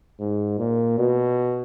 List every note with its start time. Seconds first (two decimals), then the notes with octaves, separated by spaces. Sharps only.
0.20 G#2
0.58 A#2
0.98 B2